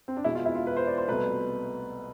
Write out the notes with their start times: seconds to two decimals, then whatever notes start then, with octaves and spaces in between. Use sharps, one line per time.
0.08 C4
0.17 D4
0.24 E2 B2 G#3 E4
0.35 F4
0.46 E4
0.55 F4
0.67 B4
0.77 C5
0.87 D5
0.98 C5
1.08 C2 B2 A3 B4